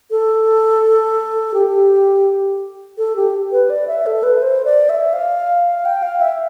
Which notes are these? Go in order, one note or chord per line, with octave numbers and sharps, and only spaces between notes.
A4
G4
A4
G4
B4
D5
E5
A4
B4
C5
D5
E5
F5
G5
F5
E5